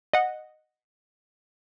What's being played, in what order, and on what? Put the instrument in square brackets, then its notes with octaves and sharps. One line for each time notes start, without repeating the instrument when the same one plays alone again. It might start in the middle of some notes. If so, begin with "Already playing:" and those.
[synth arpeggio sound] D#5 F#5